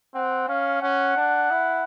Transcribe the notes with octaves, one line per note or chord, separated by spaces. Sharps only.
C4 F#5
C#4 F5
C#4 F#5
D4
E4